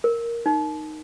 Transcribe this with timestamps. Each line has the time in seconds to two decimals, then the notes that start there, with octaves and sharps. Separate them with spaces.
0.04 A#4
0.46 D#4